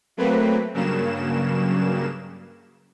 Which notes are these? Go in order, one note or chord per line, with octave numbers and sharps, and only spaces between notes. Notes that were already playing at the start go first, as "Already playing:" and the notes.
F#3 A3 A#3 C4 B4
G2 C#3 F#3 A#3 E7